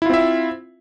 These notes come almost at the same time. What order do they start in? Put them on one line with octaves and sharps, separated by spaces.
E4 F4 C4 E5